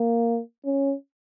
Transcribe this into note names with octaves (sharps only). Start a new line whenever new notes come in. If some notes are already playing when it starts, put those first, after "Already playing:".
Already playing: A#3
C#4